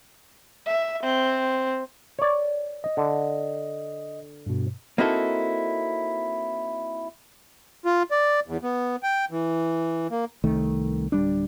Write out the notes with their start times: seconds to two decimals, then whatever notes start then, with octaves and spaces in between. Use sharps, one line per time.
0.66 E5
1.02 C4
2.19 C#5 D5
2.84 D#5
2.97 D3
4.46 G2 B2
4.98 A#3 C4 D#4 E4 F#4 A4
7.85 F4
8.11 D5
8.47 E2
8.63 B3
9.03 G5
9.31 E3
10.11 A#3
10.44 C2 D#3 A3
11.12 D1 G3 D4